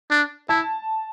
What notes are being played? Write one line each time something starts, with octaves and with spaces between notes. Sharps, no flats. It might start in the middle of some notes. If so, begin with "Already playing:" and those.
D4
E4 A5